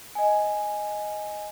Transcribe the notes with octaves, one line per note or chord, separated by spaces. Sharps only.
D#5 G#5